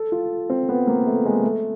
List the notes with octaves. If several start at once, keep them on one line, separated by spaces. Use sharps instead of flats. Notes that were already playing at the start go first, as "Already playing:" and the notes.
Already playing: A4
F4
C4
B3
A#3
A3
G#3
A3